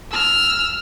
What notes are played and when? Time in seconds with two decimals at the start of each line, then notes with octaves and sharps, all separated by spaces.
0.11 E6 F6